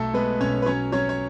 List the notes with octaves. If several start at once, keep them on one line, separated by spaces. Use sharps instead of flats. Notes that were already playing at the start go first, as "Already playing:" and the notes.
Already playing: B1 A3 A4
G#3 B3 B4
B1 C#4 C#5
B4
F#3 C#4 C#5
F#3 C#4 C#5
C#5